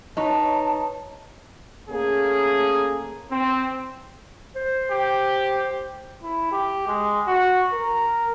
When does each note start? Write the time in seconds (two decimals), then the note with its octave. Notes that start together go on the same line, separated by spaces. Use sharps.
0.17 D#4 B4 C#5 A5
1.89 A3 A#3 C#4 G#4
3.31 C4
4.56 C5
4.91 G4
6.23 E4
6.52 G4
6.88 G#3
7.27 F#4
7.73 A#4